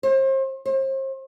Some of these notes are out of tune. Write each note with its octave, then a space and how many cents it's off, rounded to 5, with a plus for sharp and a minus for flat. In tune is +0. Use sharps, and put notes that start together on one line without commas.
C5 +35
C5 +40